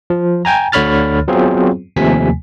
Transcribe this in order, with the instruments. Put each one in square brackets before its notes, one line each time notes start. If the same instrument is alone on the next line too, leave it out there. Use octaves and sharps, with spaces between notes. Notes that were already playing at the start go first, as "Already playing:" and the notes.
[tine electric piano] F3
G5 G#5 A#5
D2 D3 C#5 B5 F6 A6
F#3 B3 C4 F4 G#4 C5
D#2 C3 F3 A3 G#5 B6